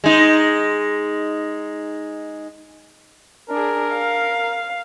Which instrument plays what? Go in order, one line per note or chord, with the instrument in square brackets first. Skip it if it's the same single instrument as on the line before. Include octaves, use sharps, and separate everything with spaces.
[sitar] G#3 D#4
[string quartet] D4 G#4 [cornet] A#4
[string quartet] F5